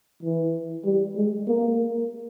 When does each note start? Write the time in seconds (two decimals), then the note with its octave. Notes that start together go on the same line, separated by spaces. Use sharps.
0.23 E3
0.85 G3
1.16 G#3
1.47 A#3